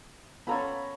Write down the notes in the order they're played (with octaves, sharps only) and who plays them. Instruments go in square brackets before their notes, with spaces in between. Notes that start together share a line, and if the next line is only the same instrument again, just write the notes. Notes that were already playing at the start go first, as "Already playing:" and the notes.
[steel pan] B3 F4 A4 [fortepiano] C#4 A#5 B5